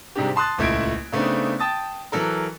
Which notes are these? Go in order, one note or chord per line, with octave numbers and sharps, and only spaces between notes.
G#2 C3 G3 G#3 D4 G4
A5 C6 D#6 F#6 A6
D#1 C#2 A3 E4 G#6 D7
C#3 A3 B3 C4 D4 D#4
G5 A5 D#6 A6
E3 F#3 A4 A#4